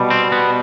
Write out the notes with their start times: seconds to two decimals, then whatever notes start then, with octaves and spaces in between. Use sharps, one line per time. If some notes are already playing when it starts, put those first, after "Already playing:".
Already playing: B2 G3
0.10 C4
0.32 B3